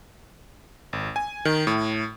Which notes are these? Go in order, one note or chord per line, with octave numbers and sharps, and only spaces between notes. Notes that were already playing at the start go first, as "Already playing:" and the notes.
G#1
G#5
D#3
A2